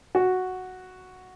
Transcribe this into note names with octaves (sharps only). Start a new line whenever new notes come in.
F#4